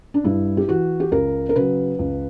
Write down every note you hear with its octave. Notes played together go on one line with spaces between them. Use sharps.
D4
G2 E4
G4
E3 F#4
G4
C#2 A#4
A#4
C#3 F#3 B4
C#2